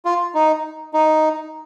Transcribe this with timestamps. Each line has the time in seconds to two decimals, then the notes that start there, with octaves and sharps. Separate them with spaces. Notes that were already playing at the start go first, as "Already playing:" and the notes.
0.05 F4
0.34 D#4
0.94 D#4